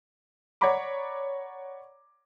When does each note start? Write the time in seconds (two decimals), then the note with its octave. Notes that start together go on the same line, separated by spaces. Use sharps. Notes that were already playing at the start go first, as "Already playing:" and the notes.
0.61 C#5 D5 F#5 A#5 B5 D6